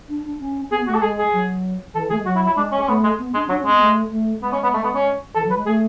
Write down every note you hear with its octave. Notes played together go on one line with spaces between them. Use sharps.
D4
D4
C#4
B3 G#4
A3 F#4
A4
G#3 G#4
G#4
F#3
E3 A4
A3 G#4
G#3
F#3 F#4
E4
E4
G#3 D4
C#4
C#4
A3 B3
G#3
B3
G#3 D4
C#4
F#3 D4
C#4
G#3 B3
A3
A3
G#3 B3
C#4
B3
A3
B3
C#4
E3 A4
F#3 B4
G#3
A3 G#4